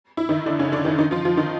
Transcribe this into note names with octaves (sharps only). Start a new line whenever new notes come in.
E4
D#3 D#4
D3 D4
C#3 C#4
D3 D4
D#3 D#4
D#3 D#4
F3 F4
F3 F4
D#3 D#4